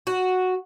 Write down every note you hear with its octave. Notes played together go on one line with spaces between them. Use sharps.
F#4